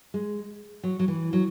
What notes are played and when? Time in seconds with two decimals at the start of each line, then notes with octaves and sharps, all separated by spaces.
0.14 G#3
0.83 F#3
0.99 F#3
1.08 E3
1.33 F#3